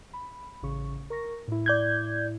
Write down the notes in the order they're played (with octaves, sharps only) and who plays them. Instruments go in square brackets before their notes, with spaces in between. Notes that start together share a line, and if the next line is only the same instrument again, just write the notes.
[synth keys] B5
A1 C#3 C#6
A#4 C#6 A#6
A2 E4
[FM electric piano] D5 G6 G#6